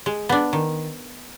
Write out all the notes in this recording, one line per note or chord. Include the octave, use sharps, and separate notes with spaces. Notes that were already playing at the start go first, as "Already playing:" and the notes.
G#3
B3 D4
D#3